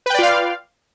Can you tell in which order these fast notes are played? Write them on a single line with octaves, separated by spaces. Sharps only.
B4 G5 D5 F4 F5